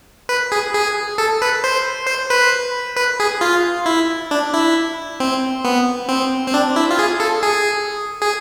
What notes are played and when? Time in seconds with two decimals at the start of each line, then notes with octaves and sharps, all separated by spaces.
0.29 B4
0.52 G#4
0.74 G#4
1.18 A4
1.42 B4
1.64 C5
2.07 C5
2.30 B4
2.96 B4
3.20 G#4
3.41 F4
3.86 E4
4.31 D4
4.54 E4
5.20 C4
5.65 B3
6.09 C4
6.47 C4
6.54 D4
6.76 E4
6.91 F4
6.99 G#4
7.20 A4
7.43 G#4
8.22 G#4